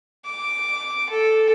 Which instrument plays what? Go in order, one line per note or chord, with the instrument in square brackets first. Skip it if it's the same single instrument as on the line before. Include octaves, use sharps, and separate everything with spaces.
[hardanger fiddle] D6
A4